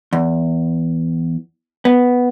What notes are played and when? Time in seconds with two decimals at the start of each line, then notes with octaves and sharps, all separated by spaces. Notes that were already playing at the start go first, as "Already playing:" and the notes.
0.13 E2
1.85 B3